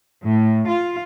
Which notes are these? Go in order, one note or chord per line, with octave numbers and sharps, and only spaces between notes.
A2
F4